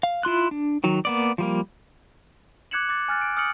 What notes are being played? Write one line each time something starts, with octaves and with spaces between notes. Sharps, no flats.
F5
E4 F4 C6 F#6
D4
D#3 F#3
A#3 B3 D5
F3 G3 A#3
D6 F#6 G#6 C#7 E7 F#7
D6 A6
G#5 F6 F#6 A6
D7
D#6 F6 A6 C#7 D7 F#7